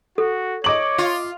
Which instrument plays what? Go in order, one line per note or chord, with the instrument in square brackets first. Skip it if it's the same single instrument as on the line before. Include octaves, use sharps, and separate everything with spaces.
[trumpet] F#4 [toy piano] A4
[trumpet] C#5 [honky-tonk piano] D#5 D6 F#7
[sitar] F4